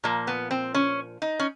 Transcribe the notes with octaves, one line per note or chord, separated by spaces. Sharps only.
A#2 F3 A#3
B3
C4
C#4
D#4
C#4